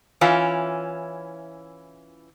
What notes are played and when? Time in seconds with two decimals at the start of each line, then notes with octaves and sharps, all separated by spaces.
0.21 E3 C#4 E4 F4